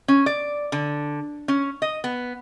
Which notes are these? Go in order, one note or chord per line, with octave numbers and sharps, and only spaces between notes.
C#4
D5
D3
C#4
D#5
B3